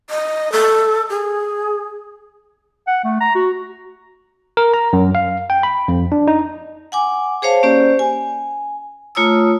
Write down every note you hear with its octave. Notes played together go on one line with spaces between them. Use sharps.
D#5
A4
G#4
F#5
A3
A#5
F#4
A#4
A#5
F#2
F5
G5
B5
F2
D4
D#4
F#5 G#5 D6
G#4 C5 C#5 F5 A5
A#3 C#4 G4 C5 D5
G#5
A3 F4 C#5 A#5 D#6 E6